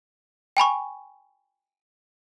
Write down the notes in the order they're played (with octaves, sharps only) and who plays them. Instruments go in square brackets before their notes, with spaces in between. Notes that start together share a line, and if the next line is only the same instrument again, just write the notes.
[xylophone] G5 G#5 B5 C#6